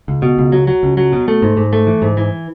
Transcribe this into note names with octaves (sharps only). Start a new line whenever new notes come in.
C#2
B2
C#2
F#3
F#3
C#2
F#3
B2
A3
G#2
G#2
A3
E3
G#2
E3